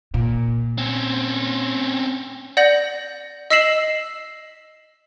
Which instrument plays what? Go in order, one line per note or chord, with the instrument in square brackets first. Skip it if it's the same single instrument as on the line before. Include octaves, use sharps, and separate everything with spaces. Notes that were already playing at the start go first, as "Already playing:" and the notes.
[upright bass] A#2
[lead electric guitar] C4 C#4
[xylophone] D5 F#5 G6 A#6 F#7
D#5 E6 B6 C7 E7 F#7